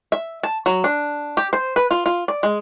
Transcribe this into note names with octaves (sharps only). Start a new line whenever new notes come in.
E5
A5
F#3
D4
G4
C5
B4
F4
F4
D5
G#3